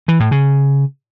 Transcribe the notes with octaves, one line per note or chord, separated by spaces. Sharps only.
E3
A2
C#3